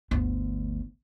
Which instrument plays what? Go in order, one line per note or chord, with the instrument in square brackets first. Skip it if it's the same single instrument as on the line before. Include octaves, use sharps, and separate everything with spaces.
[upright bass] G1 D2